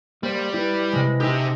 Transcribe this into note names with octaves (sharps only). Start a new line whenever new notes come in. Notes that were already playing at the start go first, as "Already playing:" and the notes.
G3 A#3 C5
E4 B4
C3 G#3
D#4 G4 A4 E5